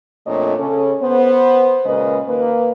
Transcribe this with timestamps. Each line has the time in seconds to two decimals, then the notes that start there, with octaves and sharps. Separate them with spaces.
0.27 F2 A#2 A3 D4 C#5 D#5
0.59 C#3 C#4 A4
1.02 B3 C5
1.86 A#2 C#3 G#3 A#4 B4 D#5
2.28 D#2 A#3 B4